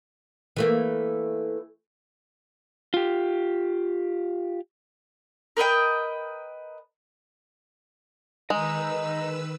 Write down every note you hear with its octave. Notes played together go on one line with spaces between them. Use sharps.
E3 A3 A#3
F4 G4
A#4 B4 D#5 G5
D#3 G#3 B4 D#5 A#5 E6